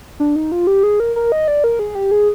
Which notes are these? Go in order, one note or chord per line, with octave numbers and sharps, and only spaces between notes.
D4
D#4
F4
G4
G#4
A#4
A#4
D#5
D5
A#4
G#4
G4
G#4